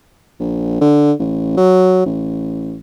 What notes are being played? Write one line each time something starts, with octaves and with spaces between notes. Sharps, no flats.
A#1
D3
A1
F#3
A1